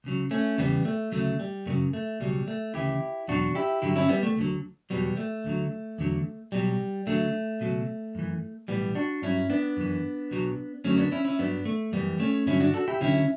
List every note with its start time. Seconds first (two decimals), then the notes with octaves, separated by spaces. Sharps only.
0.04 C#2 C#3 F#3
0.31 A3 C#4
0.58 E2 C#3 E3 G3 B3
0.85 A3
1.12 D2 C#3 F#3 A3
1.39 G3
1.66 F#2 C#3 F#3 A3
1.93 A3
2.20 C#2 B2 F#3 G3
2.48 A3
2.74 D2 C#3 E3 E4 G4
3.28 E2 B2 F#3 D4 F#4
3.55 E4 G4
3.82 G2 D3 F#3 E4 G4
3.96 C#4 E4
4.09 G3 B3
4.23 A3
4.36 D2 D3 F#3
4.90 E2 B2 F#3 G3 B3
5.17 A3
5.44 D2 D3 F#3
5.98 E2 D3 F#3
6.52 B1 B2 F#3 G3
7.07 D2 D3 F#3 A3
7.60 C#2 B2 F#3
8.15 F#2 E3
8.68 B1 A2 E3 G3 B3
8.95 D4 F#4
9.22 G2 F#3 C#4 E4
9.50 B3 D4
9.77 F#2 E3
10.31 B1 B2 F#3
10.85 F#2 D3 F#3 A3 C#4
10.98 B3 D4
11.12 C#4 E4
11.25 C#4 E4
11.39 G2 F#3 B3 D4
11.65 A3
11.92 F#2 E3 G3 B3
12.20 A3 C#4
12.46 G2 D3 F#3 C#4 E4
12.61 D4 F#4
12.74 F#4 A4
12.88 E4 G4
13.01 D2 D3 F#3 C#4 E4